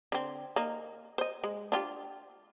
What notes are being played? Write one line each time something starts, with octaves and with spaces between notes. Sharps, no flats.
D3 C4
A#3 D#4
C5 D#5
G#3
D4 F4 G4